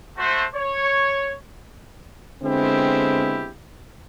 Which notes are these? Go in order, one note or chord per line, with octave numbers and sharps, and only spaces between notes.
A3 F#4 C5
C#5
D3 G#3 B3 C4 E4 G4